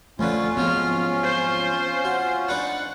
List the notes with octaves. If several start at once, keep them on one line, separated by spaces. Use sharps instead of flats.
F2 D3 A3 C#4 F4 B4
G#2 F3 F#3 B3 C4 F6
C5
F#4
D4 D#4 B4 F#5